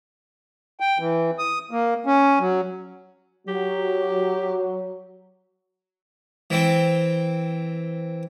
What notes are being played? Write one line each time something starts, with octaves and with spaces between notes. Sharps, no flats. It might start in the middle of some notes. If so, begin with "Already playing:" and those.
G5
E3
D#6
A#3
C#4
F#3
F#3 G4
E3 C4